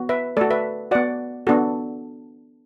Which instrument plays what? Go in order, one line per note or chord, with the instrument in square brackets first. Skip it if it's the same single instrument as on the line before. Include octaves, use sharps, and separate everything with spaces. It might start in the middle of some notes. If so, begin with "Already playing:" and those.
Already playing: [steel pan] B3 F#4
B4 E5
A3 F#4 A4 D5
B4 E5
B3 F#4 D5 F#5
B3 D4 F#4 A4